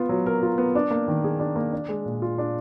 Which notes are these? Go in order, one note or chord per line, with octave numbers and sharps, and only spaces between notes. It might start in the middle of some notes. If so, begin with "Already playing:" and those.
Already playing: B3 F4
F#3
A#4
F4
B3
D4
A#3
D#3
G#4
D4
A#3
D4
G#3
A#2
F4
D4